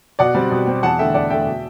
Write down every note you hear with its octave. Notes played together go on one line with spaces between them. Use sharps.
B2 D5 F#5
G3 C4
B2
G3 C4
E2 F#5 A5
D3 A3 E5 G5
E2 D5 F#5
D3 A3 E5 G5
B2